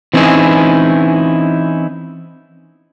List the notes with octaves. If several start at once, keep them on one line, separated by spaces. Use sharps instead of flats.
E3 C4 C#4 D#4 E4 G#4